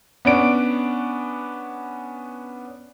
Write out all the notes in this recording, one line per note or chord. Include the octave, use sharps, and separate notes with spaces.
B3 C#4 D4 D7